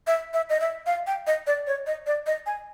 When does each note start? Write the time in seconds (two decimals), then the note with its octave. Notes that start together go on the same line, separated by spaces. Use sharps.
0.07 E5
0.34 E5
0.50 D#5
0.60 E5
0.87 F5
1.07 G5
1.27 D#5
1.47 D5
1.67 C#5
1.87 D#5
2.07 D5
2.27 D#5
2.46 G#5